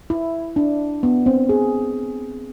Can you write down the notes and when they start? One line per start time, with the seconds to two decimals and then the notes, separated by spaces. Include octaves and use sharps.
0.10 E4
0.56 D4
1.03 B3
1.26 C4
1.49 G#4